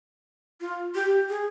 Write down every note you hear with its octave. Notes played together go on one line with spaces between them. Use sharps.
F4
G4
G#4